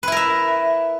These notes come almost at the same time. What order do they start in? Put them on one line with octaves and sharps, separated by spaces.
B4 E4 A#4 E5